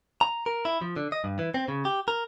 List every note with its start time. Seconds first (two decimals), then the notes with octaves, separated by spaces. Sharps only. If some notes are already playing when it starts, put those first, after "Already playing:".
0.21 A#5
0.46 A#4
0.65 E4
0.81 F3
0.96 D3
1.12 D#5
1.24 G2
1.39 E3
1.54 C4
1.68 C#3
1.85 G4
2.08 A#4